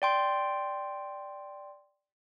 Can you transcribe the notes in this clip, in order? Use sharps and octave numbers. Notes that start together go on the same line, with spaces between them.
D5 G5 C6